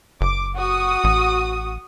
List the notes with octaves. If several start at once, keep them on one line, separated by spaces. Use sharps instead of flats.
F#1 D6
F#4 D#6
A1